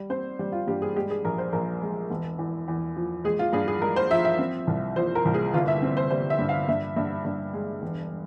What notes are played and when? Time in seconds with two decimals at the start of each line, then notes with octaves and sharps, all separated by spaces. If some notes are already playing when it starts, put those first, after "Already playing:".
Already playing: G3
0.10 C4 C5
0.39 G3
0.52 F4
0.67 G2 G4
0.82 G#4
0.96 G#3 G4
1.10 G#4
1.24 A#1 A#4
1.38 C5
1.53 A#1 A#4
1.82 G#3
2.10 E1
2.39 E2
2.68 E2
2.96 F3
3.24 G#3 G#4
3.39 F4
3.53 G2 G#4
3.68 G#4
3.82 G#3 A#4
3.96 C5
4.11 F3 E5
4.25 E5
4.39 C4
4.67 C2
4.96 F3 C5
5.15 A#4
5.25 C2
5.34 G#4
5.54 G1 F4
5.68 E5
5.82 C4
5.97 C5
6.11 G3 C5
6.30 E5
6.39 G2
6.49 F5
6.69 G2 E5
6.96 G2 E5
7.25 G2
7.54 G#3
7.82 E1